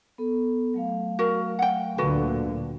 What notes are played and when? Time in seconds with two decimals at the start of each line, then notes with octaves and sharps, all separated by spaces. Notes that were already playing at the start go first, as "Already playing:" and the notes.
0.18 B3 A4
0.74 F#3 A3 F5
1.19 F#4 A#4
1.59 F#5 G5
1.98 D2 A#2 D3 F#4 A4 B4